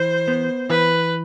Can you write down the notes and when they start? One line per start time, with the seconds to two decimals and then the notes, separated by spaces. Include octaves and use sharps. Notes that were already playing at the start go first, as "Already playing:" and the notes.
Already playing: E3 C5
0.28 B3
0.70 E3 B4